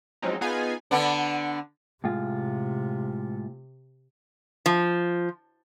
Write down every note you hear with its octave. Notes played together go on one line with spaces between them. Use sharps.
F3 F#3 G#3 C4 C#4 D#4
B3 D#4 F4 G#4 B4 G#5
D3 B3 D4
A2 C3 G#3 F4
F3